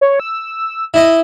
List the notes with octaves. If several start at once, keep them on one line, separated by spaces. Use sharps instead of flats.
C#5
E6
E4 D#5 D#6